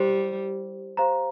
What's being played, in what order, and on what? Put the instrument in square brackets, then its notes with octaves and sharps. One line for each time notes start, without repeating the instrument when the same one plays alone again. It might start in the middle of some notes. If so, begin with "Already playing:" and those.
Already playing: [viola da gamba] G3 [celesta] E4 G4 C5
[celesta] G4 C5 F5 A#5